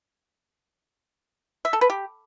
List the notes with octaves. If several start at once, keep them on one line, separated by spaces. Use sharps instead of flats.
E5
A4
B4
G4